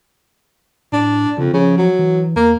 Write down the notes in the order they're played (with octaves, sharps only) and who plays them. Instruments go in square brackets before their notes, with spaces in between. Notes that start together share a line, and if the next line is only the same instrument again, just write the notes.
[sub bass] A2 [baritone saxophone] D4
[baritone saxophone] F2 [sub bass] C#3
[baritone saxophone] C#3 [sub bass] F3
[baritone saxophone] F#3
[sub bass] E3
[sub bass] E2 [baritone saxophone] A#3